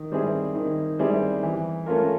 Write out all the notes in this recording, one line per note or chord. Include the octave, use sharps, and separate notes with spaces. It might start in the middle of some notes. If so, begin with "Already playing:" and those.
Already playing: D#3
G3 C4 E4 G#4
D#3
G3 C4 E4 G#4
E3
A3 C#4 F4 A#4